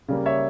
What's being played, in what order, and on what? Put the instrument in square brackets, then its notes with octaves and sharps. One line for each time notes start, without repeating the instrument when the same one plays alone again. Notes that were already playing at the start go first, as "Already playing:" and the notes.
[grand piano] C#3 G3 A#3
C#5 E5